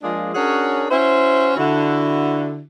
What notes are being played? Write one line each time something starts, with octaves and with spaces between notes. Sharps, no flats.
F3 G#3 A#3 D4 F4 G#4
C#4 D4 F#4 G#4 A#4 C#5
C#4 E4 F#4 C5
D3 E4 F#4